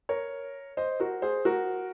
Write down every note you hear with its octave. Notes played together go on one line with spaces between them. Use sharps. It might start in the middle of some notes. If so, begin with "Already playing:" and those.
A#4 C#5
C5 D#5
F#4 A#4
G#4 C5
F#4 A#4